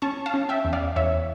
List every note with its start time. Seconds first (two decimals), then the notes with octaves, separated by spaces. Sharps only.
0.02 C#4 A5 C#6
0.26 F5 A5
0.34 C#4
0.49 E5 G5
0.65 E2
0.73 D5 F5
0.96 E2 C#5 E5